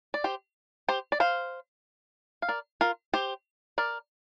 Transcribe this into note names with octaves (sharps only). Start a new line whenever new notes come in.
D5
G4 C5
G4 C5
D5
C5 F5
F5
A#4 D5
F4 A#4
G4 C5
A#4 D5